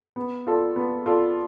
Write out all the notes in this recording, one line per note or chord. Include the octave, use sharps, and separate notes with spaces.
B3
F4 A4 D5
B3
F4 A4 D5